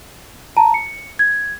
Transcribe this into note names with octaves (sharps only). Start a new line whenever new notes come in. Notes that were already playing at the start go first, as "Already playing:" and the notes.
A5 A#5
C#7
G#6